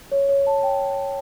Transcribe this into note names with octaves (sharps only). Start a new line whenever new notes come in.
C#5
C#5
A5
G5